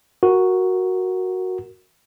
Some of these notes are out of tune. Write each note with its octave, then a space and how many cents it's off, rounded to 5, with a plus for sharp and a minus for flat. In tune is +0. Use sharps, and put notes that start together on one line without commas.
F#4 +0 A#4 +0